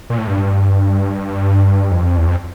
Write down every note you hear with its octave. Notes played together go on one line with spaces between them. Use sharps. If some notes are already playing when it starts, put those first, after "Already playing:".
A#2
A2
G2
F2
E2
F2